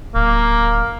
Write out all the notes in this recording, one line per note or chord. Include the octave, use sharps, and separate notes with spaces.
D1 A#3